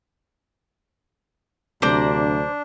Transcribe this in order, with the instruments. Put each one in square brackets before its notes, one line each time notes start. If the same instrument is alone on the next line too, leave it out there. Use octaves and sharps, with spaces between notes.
[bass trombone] D2 [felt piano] C3 F#3 [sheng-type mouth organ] D4 [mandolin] C5 D5 A#5